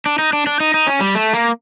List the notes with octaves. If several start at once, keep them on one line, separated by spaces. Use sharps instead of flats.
D4
D#4
D4
D4
D#4
D#4
C#4
G3
A3
A#3